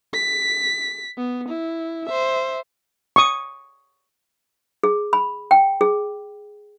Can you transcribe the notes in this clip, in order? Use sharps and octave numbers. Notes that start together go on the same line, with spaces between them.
B6
B3
E4
C5 E5
C#6 D#6
G#4
B5
G5
G#4